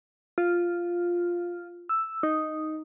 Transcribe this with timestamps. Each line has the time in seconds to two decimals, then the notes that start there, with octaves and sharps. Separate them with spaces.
0.38 F4
1.89 E6
2.23 D#4